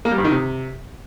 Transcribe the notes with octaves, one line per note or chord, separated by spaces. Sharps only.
A#3
G3
G2
D#3
C3